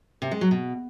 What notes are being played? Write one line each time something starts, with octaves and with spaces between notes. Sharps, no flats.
C3
G#3
F#3
B2